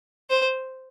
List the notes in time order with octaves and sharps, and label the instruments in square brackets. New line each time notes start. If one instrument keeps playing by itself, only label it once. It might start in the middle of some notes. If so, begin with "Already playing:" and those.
[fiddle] C5